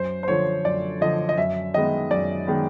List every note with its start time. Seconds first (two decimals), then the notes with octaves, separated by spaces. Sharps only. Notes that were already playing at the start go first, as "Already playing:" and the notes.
Already playing: F#2 C5
0.23 C5
0.28 D3 F3 C#5
0.65 F#2 D5
1.01 D3 F3 D#5
1.29 D#5
1.37 F#2 E5
1.74 D#3 G#3 B3 D#5
2.11 F#2 D5
2.47 D#3 G#3 B3